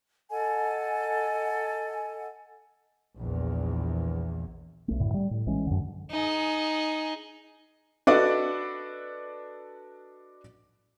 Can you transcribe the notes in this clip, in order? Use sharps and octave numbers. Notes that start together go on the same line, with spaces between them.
A4 D#5 F#5 G#5
A#1 E2
B1 A3
F#2 A2 D3
G3
A2
A#1 E3 G#3 C#4
F#2 A#2 D3
D#4 G#4
D4 F#4 A4 B4 D5 D#5